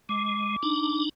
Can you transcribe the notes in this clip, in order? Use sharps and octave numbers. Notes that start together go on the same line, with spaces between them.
G#3 D6
D4 D#4